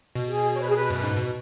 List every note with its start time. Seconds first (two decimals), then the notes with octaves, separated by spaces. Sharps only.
0.15 B2
0.29 G#4
0.54 C#5
0.61 B4
0.68 G#4
0.76 B4
0.90 F#2 B4
1.04 G#2
1.17 B2